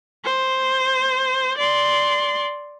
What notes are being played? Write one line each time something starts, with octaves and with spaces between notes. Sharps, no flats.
C5
D5 C6